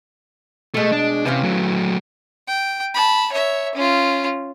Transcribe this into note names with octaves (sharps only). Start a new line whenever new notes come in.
B2 G#3 A3
D4
C3 E3 C#4 F4
F#3 A3
G5
A5 B5
C#5 E5
C#4 F4